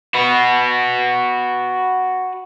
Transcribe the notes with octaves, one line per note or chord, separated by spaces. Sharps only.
F#4 B4